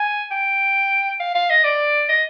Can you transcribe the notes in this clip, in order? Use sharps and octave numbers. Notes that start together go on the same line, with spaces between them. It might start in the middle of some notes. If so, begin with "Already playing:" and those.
Already playing: G#5
G5
F5
F5
D#5
D5
D#5